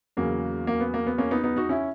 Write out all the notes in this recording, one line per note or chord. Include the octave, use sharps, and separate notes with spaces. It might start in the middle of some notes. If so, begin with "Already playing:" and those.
E2 C#3 F#3 A#3
A#3
B3
A#3
B3
A#3 C#4
B3 D#4
B3 D#4
D#4 F#4
C#4 E4